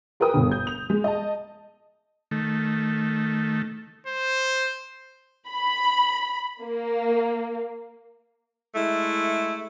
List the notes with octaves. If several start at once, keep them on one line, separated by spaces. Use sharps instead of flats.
G#4 A#4 B4 G5 D#6
G1 B2 D3
G6
F7
G#3
D#5 A5
D#3 A3
C5
B5
A#3
G#3 A3 E4